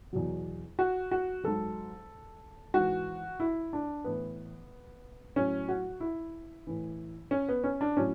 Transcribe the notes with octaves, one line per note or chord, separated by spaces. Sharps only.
E2 B2 F#3
F#4
F#4
G#2 F#3 A4
G#2 E3 F#4
E4
D4
A2 E3 B3
A2 F#3 C#4
F#4
E4
A2 E3
C#4
B3
C#4
D4
A2 F#3 C#4